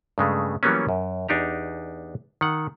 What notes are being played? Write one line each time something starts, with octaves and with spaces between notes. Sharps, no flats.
G2 C#3 G#3 A3
E3 F#3 G3 A#3 B3 C#4
F#2
E2 D4 D#4 G4 A#5
D#3 F#5